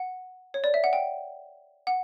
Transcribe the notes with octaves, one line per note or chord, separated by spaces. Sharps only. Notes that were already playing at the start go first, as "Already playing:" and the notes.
Already playing: F#5
C#5
D5
E5
F#5
G5
F#5